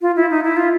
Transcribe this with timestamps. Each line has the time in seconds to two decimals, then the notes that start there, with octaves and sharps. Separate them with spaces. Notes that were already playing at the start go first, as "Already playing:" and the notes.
0.02 F4
0.16 E4
0.30 D#4
0.44 E4
0.57 F4